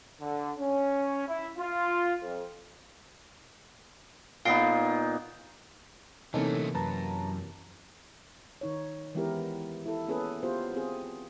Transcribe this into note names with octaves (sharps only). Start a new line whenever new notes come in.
D3
C#4
E4
F4
F2
A#2 B3 D#4 F5 C7 D7
C3 E3 F#3 A3 A#3 C#4 D#4 A4
F#2 B4 A5 A#5
D#3 D#4 C#5
E3 G#3 B3 E4 G4 A#4
E4 A4
A#3 B3 C#4 G#4 A4 B4
B3 F4 G4 C5
C4 G#4